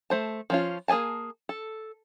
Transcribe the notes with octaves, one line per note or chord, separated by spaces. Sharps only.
A3 C5 A5
F3 C#4 F4
A#3 G#4 D#5 G#5 A5
A4